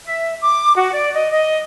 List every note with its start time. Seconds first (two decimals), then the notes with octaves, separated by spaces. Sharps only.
0.05 E5
0.42 D6
0.77 F#4
0.95 D5
1.15 D#5
1.31 D#5